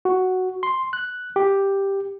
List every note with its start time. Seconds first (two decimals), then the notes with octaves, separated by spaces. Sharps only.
0.05 F#4
0.63 C6
0.93 F#6
1.36 G4